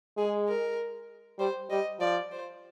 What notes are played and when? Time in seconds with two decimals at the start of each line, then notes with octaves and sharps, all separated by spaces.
0.17 G#3 G#4
0.48 A#4
1.39 G3 C5
1.70 G3 D#5
2.00 F3 D5
2.32 C5